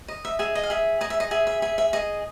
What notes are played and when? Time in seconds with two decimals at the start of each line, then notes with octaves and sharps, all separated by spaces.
0.08 D#5
0.25 E5
0.39 G#4 E5
0.55 D#5
0.63 F5
0.70 G#4 E5
1.01 G#4 D#5
1.10 E5
1.20 D#5
1.31 G#4 E5
1.47 E5
1.62 G#4 E5
1.78 E5
1.93 G#4 D#5